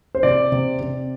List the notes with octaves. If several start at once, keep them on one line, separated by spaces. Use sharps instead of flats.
C5
C3 D5
C3
C3